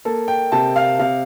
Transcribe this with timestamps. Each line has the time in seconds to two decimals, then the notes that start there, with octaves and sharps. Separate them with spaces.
0.05 A#3 A4
0.28 G5
0.52 C3 A5
0.76 F5
0.99 C3 F5